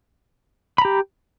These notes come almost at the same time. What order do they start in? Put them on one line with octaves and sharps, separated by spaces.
B5 A#5 G4